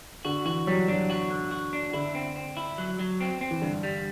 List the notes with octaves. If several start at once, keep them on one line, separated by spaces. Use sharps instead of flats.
D3 F#4
E3 F#4
F#3 G3
F#3 D4
F#4
D3
F#4
D4
D3 E4
C4
C4
E4
F#3
F#3
C4
C4
E3
G2 D3
G3